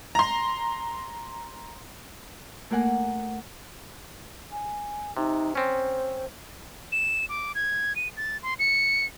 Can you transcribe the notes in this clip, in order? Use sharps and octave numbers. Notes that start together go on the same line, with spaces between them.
A#5 C6
A3 A#3 A#4 F#5 G#5
G#5
C3 D#4
C4 C#4 C5
E7
D6
G#6
D#7
A6
C6
C#7